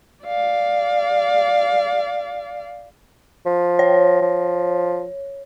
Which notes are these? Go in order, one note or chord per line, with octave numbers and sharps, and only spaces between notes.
D5 F5
F3
C#5
F3